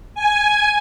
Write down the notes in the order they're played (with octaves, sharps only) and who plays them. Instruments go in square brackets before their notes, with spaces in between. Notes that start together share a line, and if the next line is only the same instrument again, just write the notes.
[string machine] G#5